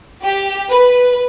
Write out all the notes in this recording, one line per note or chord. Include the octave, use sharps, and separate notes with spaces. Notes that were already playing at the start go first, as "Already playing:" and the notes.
G4
B4